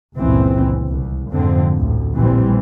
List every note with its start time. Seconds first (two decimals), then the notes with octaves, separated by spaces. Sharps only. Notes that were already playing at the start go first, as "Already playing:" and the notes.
0.18 G1 C#2 A#2 E3 C4
0.87 C2
1.32 F2 G#2 D3 C4
1.75 A1 D2
2.13 A#1 A2 E3 G3 C4